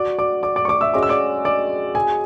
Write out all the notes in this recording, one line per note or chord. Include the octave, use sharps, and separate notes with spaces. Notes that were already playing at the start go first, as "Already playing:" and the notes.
Already playing: F#4 D5 D6
D5 D6
D5 D6
D5 D6
C#6
D5 D6
E5 E6
G#3 C#4 F#4 D6
E6
D5 D6
D5 D6
G#4 G#5